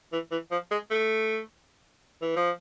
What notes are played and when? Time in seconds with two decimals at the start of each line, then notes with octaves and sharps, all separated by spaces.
0.12 E3
0.32 E3
0.51 F3
0.71 G#3
0.90 A3
2.22 E3
2.36 F3